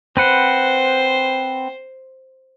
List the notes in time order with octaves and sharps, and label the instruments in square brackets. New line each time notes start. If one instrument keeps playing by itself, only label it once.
[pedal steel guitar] C4 B4 F#5 [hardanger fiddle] C5